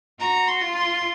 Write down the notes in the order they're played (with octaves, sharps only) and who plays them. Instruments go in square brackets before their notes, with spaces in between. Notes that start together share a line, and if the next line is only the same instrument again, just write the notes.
[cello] F#4 [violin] A#5
[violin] C6
[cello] F4
[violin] C6